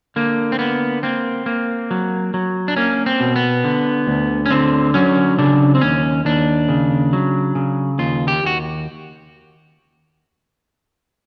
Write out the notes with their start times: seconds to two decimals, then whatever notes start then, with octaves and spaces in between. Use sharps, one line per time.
0.16 D3 A#3
0.52 C4
0.59 A#3 B3
1.03 A#3 C4
1.46 A#3
1.91 F#3
2.34 F#3
2.68 D4
2.76 A#3 C#4
3.06 C4
3.20 B2
3.36 B3
3.65 D3
4.07 D2
4.46 C#4
4.51 D3 C4
4.94 F#3 C#4
5.39 C#3 D4
5.75 C4
5.81 D#2 C#4
6.25 D#2 D4
6.69 C#3
7.13 F#3
7.55 C#3
7.99 D#2 F4
8.28 G4
8.43 D#2 F#4